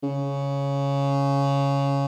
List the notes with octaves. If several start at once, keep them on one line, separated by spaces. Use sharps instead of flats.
C#3